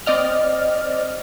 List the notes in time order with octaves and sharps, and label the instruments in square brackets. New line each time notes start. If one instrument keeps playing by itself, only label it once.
[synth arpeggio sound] C4 D5 D#5 F6